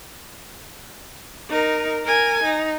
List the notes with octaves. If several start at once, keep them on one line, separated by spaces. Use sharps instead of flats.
D#4 A#4
A#4 G#5
D#4